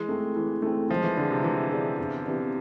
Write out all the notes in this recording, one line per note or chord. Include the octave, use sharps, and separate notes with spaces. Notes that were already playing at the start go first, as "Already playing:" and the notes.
Already playing: E3 G#3
A3 C4
E3
A3 C4
F3 G#3
E3
D3 D4 G#4
C3
E3 G#3
D4 G#4
E2
C3 E3 B3 D4